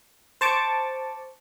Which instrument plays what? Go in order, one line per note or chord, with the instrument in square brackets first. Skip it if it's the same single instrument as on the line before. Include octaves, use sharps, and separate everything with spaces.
[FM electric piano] C5 A5 C#6 D6